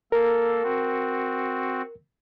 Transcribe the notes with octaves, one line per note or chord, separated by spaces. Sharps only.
A#3 A4 A#4
C4 F#4